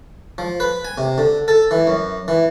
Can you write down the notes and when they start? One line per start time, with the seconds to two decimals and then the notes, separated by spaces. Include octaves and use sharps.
0.38 F3
0.60 B4
0.85 G#5
0.98 C3
1.18 D3
1.48 A4
1.71 E3
1.87 F#2
2.28 E3